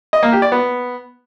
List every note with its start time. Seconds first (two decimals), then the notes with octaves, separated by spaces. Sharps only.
0.13 D#5
0.23 A#3
0.32 G4
0.42 D5
0.52 B3